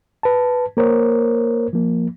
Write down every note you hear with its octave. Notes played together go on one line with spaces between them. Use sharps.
B4 A5
A#3 A#4 C5 C#5
F3 A#3